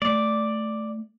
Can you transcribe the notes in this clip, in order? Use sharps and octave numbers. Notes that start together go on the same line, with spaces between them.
A3 D5